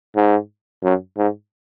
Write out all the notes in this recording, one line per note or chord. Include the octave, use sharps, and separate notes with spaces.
G#2
F#2
G#2